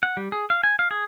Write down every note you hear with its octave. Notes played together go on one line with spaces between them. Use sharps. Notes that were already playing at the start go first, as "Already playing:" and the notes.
F#5
G3
G#4
F5
G#5
F5
G#4